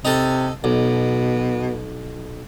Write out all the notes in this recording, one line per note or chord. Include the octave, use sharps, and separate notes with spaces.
C3 D#4 A4
B1 B2